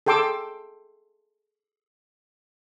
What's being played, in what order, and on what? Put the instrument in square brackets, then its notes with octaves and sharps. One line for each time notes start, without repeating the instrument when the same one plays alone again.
[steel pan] G#4 A4 G5 C6 D6 E6